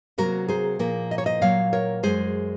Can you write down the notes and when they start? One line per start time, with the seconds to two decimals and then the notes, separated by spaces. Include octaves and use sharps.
0.18 C3 F#3 A#3 F#4 A#4
0.48 G#4 C5
0.79 A#2 F3 A#3
1.11 D#5
1.18 C#5
1.26 C5 D#5
1.41 A#2 F#3 A#3 C#5 F5
1.73 A#4 C#5
2.03 F#2 C#3 G#3 G#4 C5